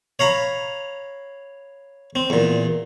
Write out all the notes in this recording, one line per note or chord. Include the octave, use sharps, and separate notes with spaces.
C#5 F5 A#5 B5
C4
E2 A#2